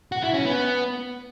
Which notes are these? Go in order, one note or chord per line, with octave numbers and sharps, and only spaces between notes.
F#4
E4
C#4
B3